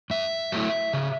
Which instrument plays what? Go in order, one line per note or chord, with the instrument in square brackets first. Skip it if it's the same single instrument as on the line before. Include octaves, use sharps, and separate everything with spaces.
[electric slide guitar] F#2 E5
F#3 A3 E4
C#3